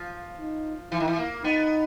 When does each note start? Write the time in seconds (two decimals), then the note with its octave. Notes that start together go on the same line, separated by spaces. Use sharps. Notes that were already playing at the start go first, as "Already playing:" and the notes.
Already playing: F3
0.38 D#4
0.91 E3 E4
1.00 D#3
1.08 E3
1.18 A#3
1.44 B3 D#4